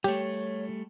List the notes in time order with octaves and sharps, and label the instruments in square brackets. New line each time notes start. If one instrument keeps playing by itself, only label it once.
[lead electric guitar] G3 A3 [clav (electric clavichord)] G4 [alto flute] C#5